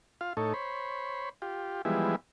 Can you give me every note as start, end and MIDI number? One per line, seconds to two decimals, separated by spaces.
0.21 0.33 65
0.21 0.33 77
0.37 0.53 45
0.37 0.53 63
0.37 0.53 69
0.37 0.53 73
0.54 1.29 72
0.54 1.29 73
0.54 1.29 83
1.42 1.82 65
1.42 1.82 67
1.85 2.16 52
1.85 2.16 53
1.85 2.16 55
1.85 2.16 56
1.85 2.16 59
1.85 2.16 64